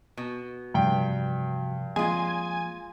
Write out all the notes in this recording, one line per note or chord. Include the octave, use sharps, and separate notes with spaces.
B2
G2 C3 E3 F3 G5
F3 G#3 A#3 C4 F4 G#5